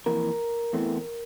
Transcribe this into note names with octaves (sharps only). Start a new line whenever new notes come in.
F2 E3 A#3 A#4
E2 E3 A3 C4